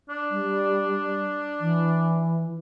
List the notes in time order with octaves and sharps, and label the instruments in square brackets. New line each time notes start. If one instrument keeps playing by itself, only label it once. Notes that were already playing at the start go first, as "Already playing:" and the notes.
[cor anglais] D4
[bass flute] G3
E3